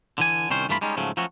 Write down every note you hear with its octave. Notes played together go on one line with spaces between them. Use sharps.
D3 E3 G#5
C2 D#3 C#4 C5
G2 E3 A3 A#3 F4 B5
G3 G#3 C#4 D#4
G#2 C#3 F3 F#3 A3 C#4
F3 F#3 A3 C#4 F#4